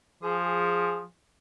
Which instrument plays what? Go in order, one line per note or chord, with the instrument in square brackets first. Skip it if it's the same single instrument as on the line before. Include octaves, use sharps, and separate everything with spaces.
[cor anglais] F3 [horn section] G#4